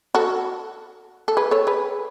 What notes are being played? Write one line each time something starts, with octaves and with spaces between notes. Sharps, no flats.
F#4 A4
A4
G#4 B4
A4 C#5
G#4 B4